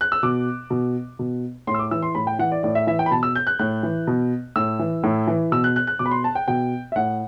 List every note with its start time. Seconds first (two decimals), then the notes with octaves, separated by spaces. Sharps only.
0.01 F#6
0.12 E6
0.23 B2 D6
0.70 B2
1.19 B2
1.67 A2 C6
1.74 E6
1.79 D6
1.91 E3 E6
2.02 C6
2.15 A2 B5
2.27 G5
2.39 E3 F#5
2.52 D5
2.63 A2 D5
2.75 E5
2.87 E3 E5
2.99 G5
3.06 B5
3.11 B2 A5
3.23 E6
3.36 G6
3.47 F#6
3.59 A2 F#6
3.83 E3
4.07 B2
4.56 A2 E6
4.79 E3
5.03 A2
5.27 E3
5.52 B2 E6
5.64 F#6
5.76 F#6
5.87 F#6
5.99 B2 D6
6.06 B5
6.11 C6
6.24 A5
6.35 G5
6.48 B2 G5
6.92 E5
6.96 A2 F#5